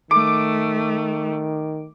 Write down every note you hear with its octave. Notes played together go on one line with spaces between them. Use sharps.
D#3 A3 D6